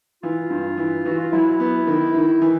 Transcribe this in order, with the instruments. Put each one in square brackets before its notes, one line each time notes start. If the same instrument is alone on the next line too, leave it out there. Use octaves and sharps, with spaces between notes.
[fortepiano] E3 [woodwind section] F4
[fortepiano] G2
E3
[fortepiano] E3 [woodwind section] F#4
[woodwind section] F4
[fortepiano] F#3 [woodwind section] E4
[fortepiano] B3
D#3
D#3
E3